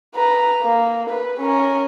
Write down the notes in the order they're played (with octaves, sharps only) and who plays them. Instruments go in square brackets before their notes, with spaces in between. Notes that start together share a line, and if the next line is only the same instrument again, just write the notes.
[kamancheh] B4 A#5
A#3
B4
C#4 A#4